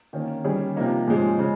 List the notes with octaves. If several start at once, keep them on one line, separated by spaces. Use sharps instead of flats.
D#3 A#3 C#4
D#3 G3 C#4 G#4
C3 F3 A#3 D#4
G#2 F3 G#3 C#4
C#3 G#3